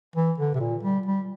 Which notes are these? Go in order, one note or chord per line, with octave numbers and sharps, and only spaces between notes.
E3
D3
C3
A#2
G3
G3